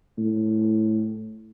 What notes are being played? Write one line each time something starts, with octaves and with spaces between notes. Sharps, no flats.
A2